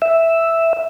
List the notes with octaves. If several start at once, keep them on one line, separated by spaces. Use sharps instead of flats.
E5